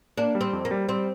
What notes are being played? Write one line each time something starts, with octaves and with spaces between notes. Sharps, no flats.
A#3 D4
G3
C4
F2
A#3
G3
G3 C4